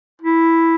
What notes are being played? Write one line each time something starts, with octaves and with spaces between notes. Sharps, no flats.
E4